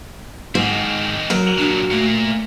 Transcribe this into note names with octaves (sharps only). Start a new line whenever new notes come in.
G#2 D#3 C4
F#3 F#4 A#4
A#2 F#3 D4
A#2 A3 A#3